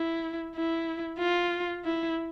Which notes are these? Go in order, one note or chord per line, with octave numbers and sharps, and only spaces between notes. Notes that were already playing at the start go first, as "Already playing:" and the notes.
Already playing: E4
E4
F4
E4